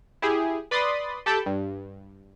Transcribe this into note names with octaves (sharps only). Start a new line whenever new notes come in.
E4 G4 G#4
B4 D5 B5 C6 D#6 A6
G4 A4 G5 A5 B5 G6
G2